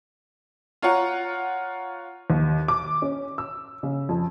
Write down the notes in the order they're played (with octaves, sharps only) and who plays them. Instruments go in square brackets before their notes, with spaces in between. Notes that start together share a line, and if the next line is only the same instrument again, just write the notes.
[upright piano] F4 C#5 F#5 A#5
[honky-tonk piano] D#2
D6
C#4
E6
C#3
F2